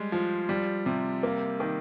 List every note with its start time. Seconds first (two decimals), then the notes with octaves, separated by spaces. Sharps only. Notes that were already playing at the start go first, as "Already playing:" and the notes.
Already playing: G3 G#3
0.12 F3
0.49 G3
0.86 C3
1.23 A#3
1.60 D#3